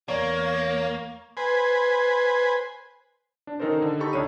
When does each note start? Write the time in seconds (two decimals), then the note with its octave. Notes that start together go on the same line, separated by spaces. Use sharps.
0.08 E2 A#3 C#5 D5
1.37 B4 C5 G#5
3.47 D4
3.60 D#3 C#4 D#4 A4 A#4 C5
3.82 D3
3.99 D#4 G4 A4 B5 C#6
4.13 C#2 D4 C#5 D#7